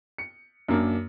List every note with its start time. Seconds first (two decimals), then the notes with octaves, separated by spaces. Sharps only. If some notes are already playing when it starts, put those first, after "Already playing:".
0.18 C#7
0.68 F#2 A#3 D4